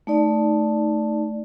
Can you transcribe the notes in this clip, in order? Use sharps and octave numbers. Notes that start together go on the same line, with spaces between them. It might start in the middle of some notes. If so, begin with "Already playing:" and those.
A3 D#4 D5